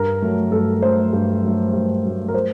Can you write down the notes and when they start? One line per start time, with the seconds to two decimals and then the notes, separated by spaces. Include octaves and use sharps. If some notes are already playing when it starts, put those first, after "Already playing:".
Already playing: G2 A#4
0.22 F#3 A3
0.52 G2 A4
0.82 F#3 A3 C5
1.13 G2
1.43 F#3 A3
1.74 G2
2.04 F#3 A3
2.28 A#4
2.34 C5